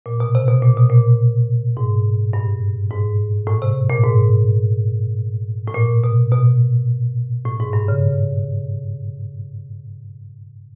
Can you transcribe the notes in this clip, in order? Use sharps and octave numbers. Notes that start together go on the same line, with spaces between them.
A#2
B2
C3
B2
A#2
B2
A#2
G#2
G2
G#2
A2
C3
A#2
G#2
A2
A#2
B2
B2
A2
G#2
G2
C#3